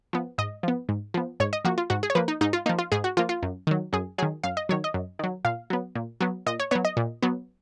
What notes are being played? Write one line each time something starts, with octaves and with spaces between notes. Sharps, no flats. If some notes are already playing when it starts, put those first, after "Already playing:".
F3 B3
G#2 D#5
F3 B3
G#2
F3 B3
G#2 C#5
D#5
F3 A#3 F#4
F4
G#2 F#4
G#4
C#5
F3 A#3 B4
D#4
G#2 D#4
F4
F3 A#3 D#4
F4
G#2 G#4
F#4
F3 A#3 F4
F4
F#2
D#3 F#3
F#2 G#4
D#3 F#3 G#4
F#2 F5
D#5
D#3 F#3 C#5
D#5
F#2
D#3 F#3
A#2 F5
F#3 B3
A#2
F#3 B3
A#2 D#5
C#5
F#3 B3 C#5
D#5
A#2
F#3 B3